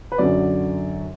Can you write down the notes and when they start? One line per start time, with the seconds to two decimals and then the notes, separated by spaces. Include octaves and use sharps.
0.12 B4
0.18 F#2 D3 F#3 D5